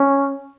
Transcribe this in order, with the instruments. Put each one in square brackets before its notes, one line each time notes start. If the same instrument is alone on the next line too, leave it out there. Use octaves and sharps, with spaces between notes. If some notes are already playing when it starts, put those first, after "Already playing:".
Already playing: [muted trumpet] C#4